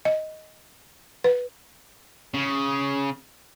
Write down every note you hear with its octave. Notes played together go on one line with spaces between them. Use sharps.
D#5
B4
C#3